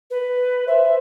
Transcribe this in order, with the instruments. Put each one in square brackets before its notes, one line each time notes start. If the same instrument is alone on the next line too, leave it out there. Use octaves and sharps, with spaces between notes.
[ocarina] B4
[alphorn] C5 [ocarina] E5